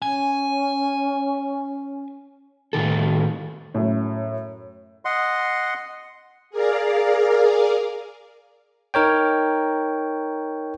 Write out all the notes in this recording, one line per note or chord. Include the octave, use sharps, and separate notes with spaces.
C#4 G#5
A2 D#3 A4
F#2 A2
D#5 F#5 C6
G#4 A#4 D5 F5
D#4 A#4 C#5 G5